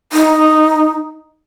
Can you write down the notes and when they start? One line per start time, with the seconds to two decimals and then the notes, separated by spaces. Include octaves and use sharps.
0.13 D#4